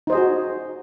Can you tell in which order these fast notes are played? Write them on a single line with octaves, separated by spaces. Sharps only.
D#4 C5 D#5 G#4 F#4